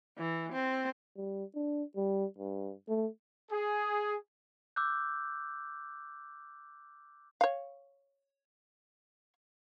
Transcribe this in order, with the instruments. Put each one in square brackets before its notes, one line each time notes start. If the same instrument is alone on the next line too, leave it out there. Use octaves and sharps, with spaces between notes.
[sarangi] E3
C4
[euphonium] G3
D4
G3
G2
A3
[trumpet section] G#4
[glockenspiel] D6 E6 F#6 G6
[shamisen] C#5 F5